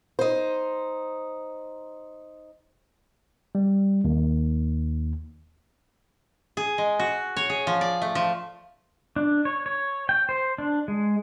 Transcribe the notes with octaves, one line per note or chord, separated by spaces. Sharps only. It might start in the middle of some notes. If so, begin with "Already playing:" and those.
D#4 C5
G3
D#2
G#4
G#3
F#4
C#5
G#4
F3
D5
A3
F3
D4
C#5
C#5
G5
C5
D4
G#3